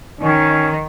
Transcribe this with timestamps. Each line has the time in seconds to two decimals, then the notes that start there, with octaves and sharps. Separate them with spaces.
0.20 D#3 C#4